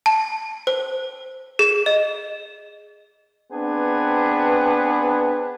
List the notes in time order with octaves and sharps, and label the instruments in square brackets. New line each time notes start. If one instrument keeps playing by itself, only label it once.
[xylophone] A5
C5
G#4
D#5
[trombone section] B3 C4 D4 G#4 B4